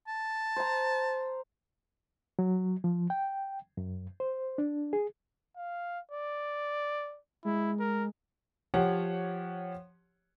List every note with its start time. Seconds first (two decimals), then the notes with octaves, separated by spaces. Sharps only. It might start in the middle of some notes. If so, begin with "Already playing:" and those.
0.08 A5
0.56 C5 A#5
2.39 F#3
2.84 F3
3.10 G5
3.77 F#2
4.20 C5
4.58 D4
4.93 G#4
5.57 F5
6.11 D5
7.45 G#3 E4
7.79 A#4
8.74 F3 G4 C#5 F#5